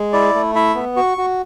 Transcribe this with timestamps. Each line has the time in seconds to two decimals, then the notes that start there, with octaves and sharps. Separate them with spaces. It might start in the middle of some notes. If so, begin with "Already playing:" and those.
Already playing: G#3
0.13 E4 D5
0.34 A3
0.55 E4 E5
0.75 B3
0.96 F#4 C#6
1.18 F#4